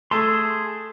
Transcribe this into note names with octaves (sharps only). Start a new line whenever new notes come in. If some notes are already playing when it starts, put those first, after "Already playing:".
A3 G#4 A5 C6